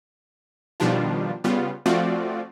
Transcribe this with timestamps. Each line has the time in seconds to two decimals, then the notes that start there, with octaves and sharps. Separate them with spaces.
0.80 B2 D#3 F3 G3 D4 F4
1.44 C#3 G3 B3 F4
1.86 F3 A3 C4 F4 F#4 D5